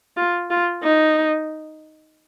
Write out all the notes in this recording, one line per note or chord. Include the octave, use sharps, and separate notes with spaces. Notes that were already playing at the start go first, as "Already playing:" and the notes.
F4
F4
D#4